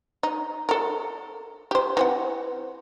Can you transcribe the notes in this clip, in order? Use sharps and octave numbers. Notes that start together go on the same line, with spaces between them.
D#4
A4 A#4
G4 C5
E3 C4 F#5